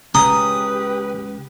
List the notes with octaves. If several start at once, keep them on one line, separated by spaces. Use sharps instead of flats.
C#2 F#2 C#3 G4 B4 A#5 D#6